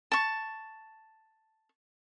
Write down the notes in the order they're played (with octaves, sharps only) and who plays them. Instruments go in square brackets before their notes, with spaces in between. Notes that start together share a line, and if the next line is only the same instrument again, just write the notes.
[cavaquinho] A5 C#6